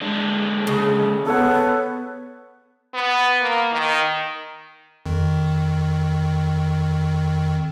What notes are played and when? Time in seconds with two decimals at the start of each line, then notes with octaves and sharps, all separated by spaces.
0.01 D3 G#3 D4
0.67 C#3
1.26 B3 A4 C#5 F#5
2.94 B3
3.41 A#3
3.72 D#3
5.06 F2 D#3